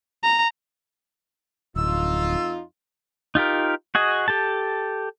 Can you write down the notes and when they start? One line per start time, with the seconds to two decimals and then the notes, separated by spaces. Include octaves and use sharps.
0.23 A#5
1.76 D1 F2 D#4 F4 E6
3.35 D#4 F4 G4 A#4
3.95 F#4 G#4 D#5
4.28 G4 A4 A5